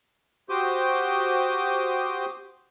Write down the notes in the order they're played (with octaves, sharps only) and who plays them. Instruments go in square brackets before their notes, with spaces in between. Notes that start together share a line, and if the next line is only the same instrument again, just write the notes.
[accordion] F#4 G4 C5 C6 D6 D#6